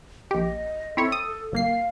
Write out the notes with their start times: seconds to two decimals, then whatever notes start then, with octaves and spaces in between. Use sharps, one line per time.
0.31 A#1 G4 D#5
0.97 C4 E4 A4 C#5
1.12 D#6
1.53 G1 A#3 F5 C7